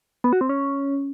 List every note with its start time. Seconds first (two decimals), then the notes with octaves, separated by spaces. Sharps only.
0.24 B3
0.33 F#4
0.41 C4
0.49 C#4